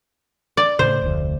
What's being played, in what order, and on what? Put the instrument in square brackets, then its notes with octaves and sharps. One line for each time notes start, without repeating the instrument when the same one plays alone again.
[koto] D5
[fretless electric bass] A2 C#3 [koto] C5
[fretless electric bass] F1 D2